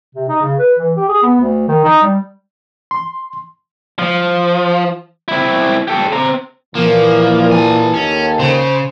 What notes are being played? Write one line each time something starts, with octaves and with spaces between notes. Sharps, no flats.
C3
D#4
C#3
B4
E3
G4
G#4
B3
D2
D#3
D#4
G3
C6
F3
C4 E4
G4 A4
C4 A#5
A#2 E3 F3 A#3
A4 G#5
D#2 C#4
C#3 C5